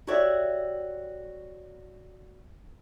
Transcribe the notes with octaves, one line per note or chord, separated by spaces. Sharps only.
F#4 G4 A4 C#5 D5 E5